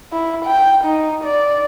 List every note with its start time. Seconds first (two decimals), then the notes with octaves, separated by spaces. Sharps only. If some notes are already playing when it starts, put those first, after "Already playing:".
0.13 E4
0.45 G5
0.84 D#4
1.24 D5